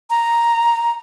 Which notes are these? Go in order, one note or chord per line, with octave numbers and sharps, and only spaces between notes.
A#5